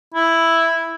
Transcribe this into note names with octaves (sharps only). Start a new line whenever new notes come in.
E4